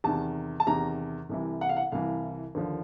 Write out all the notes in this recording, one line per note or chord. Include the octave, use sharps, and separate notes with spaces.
E2 C3 D#3 A5
A5
E2 C3 D#3 A#5
C2 C3 E3
F#5
F5
F#5
C2 C3 E3 F5
D#2 D3 F3